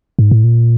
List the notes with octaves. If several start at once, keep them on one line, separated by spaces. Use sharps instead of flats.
G#2
A2
A#2